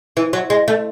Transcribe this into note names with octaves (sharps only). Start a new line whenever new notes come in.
E3
F#3
G#3
A3